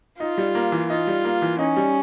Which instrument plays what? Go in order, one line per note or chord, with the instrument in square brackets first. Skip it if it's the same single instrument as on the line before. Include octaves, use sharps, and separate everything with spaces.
[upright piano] D#4 [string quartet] F4
[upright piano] G3
A#3
E3
[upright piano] D#4 [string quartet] F4
[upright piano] G3
A#3
E3
[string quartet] C#4 [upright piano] D#4
[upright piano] G3